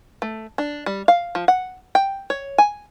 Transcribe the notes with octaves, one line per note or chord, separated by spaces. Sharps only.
A3
D4
G3
F5
F3
F#5
G5
C#5
G#5